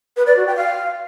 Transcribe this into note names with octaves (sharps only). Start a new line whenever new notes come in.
B4
D5
F#4
G5
F5